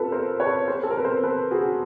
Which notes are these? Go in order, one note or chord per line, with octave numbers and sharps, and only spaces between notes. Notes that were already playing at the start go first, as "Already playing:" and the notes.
Already playing: F4 A4 B4
A#4 C5
B4 C#5
A#4 C5
A4
A#4
B4
A#4 C5
A4 B4
F#4 G#4